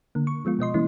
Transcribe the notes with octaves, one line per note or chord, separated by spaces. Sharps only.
D3 A#3
C#6
F3 G#3 B3 F4
B2 B3 D#5 C6
E3 G3 A#3 C#4 E4